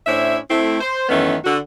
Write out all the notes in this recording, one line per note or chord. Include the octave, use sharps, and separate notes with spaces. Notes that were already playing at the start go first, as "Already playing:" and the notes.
A2 C#4 D4 E4 C5 E5
A3 C4 E4
C5
F#2 D#3 E3 A3 B3 C#4
D3 F#4